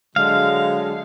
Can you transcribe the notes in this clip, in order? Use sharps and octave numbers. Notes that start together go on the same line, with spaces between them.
D3 F#3 G#3 F5